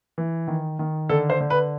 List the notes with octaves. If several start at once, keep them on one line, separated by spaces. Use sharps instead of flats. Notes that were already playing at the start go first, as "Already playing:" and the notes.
E3
D#3
D#3
D3 A4
C5
D3
B4